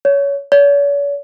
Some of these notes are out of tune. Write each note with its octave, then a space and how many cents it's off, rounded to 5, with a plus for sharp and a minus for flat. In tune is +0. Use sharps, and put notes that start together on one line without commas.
C#5 +20
C#5 +45